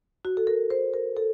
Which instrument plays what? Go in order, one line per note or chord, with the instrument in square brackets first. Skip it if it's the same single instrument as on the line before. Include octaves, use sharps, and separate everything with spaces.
[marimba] F#4
A4
A#4
C5
A#4
A4